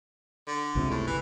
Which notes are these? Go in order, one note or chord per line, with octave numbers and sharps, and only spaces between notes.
D3
G1 C#2 C3
A2
E3